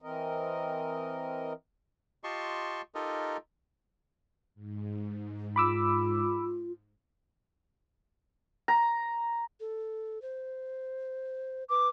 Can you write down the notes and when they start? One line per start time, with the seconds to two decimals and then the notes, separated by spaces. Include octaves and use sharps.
0.02 E3 C4 A#4 D#5
2.24 F4 G4 D#5 A5 C6 C#6
2.95 D#4 F4 G4 A4 A#4 D#5
4.55 G#2
5.56 F4 B5 D6 E6
8.68 A#5
9.60 A4
10.22 C5
11.70 B4 D6